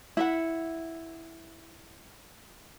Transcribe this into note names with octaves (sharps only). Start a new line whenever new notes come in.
E4 E5 F#5